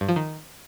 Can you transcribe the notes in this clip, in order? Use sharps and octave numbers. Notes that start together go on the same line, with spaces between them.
G2
F3
D#3